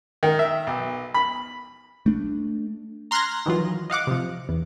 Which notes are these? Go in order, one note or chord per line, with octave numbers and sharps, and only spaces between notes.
D#3
E5
B1
B5
A3 D4
A#5 C6 F6 F#6 G#6 A#6
D#3 E3 F#3 F4
D#5 F5 F#5 D6
C3 F3
E2